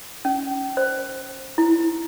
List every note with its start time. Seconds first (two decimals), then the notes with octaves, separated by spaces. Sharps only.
0.25 C#4
0.77 C5
1.58 E4